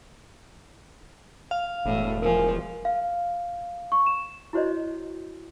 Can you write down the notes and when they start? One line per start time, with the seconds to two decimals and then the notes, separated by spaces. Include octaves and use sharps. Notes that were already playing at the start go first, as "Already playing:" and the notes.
1.51 F5
1.85 E1 A2
2.22 F3 A#4 G#5
2.85 F5
3.92 C#6
4.06 E7
4.53 E4 F#4 C5 C#5 D#5